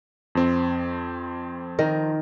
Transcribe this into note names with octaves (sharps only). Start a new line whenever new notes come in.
F2 C4
D#3 A#4